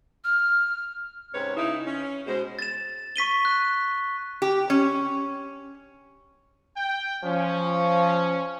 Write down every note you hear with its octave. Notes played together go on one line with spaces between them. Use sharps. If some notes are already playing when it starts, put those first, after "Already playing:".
F6
G#2 C3 C4 C#4 B4 C#5
C#3 D#4 E4
C#4
B2 G#3 C5
A6 E7
C#6 B6 D#7 G7
F#6
G4
C#4
G5
F3 C#4